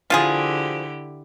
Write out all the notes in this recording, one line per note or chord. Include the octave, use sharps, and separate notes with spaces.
D3 F3 E4 F4 G4 G#4